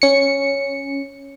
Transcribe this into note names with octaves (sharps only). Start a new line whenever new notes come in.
C#4 C#7